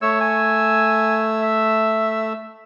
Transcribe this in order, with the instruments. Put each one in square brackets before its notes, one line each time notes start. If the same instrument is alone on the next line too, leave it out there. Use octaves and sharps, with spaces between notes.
[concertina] A3 E6 [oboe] C#5
[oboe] G#5
E5